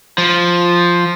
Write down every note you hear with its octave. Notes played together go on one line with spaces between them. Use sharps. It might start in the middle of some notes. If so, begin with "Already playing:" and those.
F3